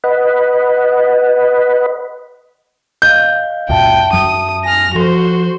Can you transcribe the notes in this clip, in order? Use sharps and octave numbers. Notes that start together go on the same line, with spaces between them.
B4 D#5 F#5 B5
D#5 F5 G6
C#2 F#2 A#2 E5 G5 A5
F#2 F#3 D#6
G#5 F6 A#6
F3 F#4 A4 C5 C6